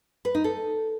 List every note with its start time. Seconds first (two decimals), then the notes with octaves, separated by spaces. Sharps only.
0.25 B4
0.35 D#4
0.44 A4